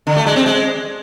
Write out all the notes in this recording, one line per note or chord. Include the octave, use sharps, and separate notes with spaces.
D3
A3
G#3
C4
G#3